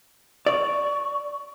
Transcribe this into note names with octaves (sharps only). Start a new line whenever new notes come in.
D5 C#6